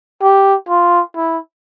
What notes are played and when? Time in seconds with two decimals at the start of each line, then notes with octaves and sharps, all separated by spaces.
0.22 G4
0.69 F4
1.16 E4